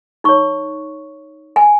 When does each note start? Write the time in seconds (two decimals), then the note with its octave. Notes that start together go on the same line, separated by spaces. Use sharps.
0.24 D#4 C#5 C#6
1.56 G#5